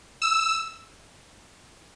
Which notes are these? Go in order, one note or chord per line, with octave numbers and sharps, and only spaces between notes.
E6